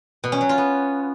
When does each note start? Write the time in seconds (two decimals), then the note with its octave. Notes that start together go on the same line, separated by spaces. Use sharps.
0.24 B2
0.32 C#4
0.41 F#3
0.49 F4
0.58 B3